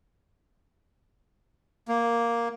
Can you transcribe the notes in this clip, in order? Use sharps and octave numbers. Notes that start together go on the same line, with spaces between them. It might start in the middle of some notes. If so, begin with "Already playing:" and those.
A#3